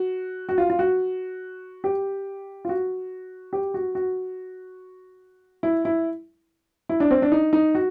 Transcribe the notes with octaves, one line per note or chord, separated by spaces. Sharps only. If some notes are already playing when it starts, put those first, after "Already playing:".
Already playing: F#4
F#4
F4
F4
F#4
G4
F4
F#4
G4
F#4
F#4
E4
E4
E4
D4
C4
D4
D#4
D#4
F#4